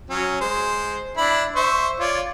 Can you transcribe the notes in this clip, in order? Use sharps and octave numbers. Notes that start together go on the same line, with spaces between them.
F#3 C#4
G#3 C5
D4 E4 B5
C5 E5 C#6
F4 C#5 D5